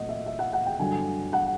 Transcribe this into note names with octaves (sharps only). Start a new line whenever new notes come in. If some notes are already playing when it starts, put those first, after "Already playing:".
Already playing: A#2 F#3 A3 C4 D#5 F#5
E5
E5
F#5
F#5
G5
G2 D3 F#3 G#5
F#5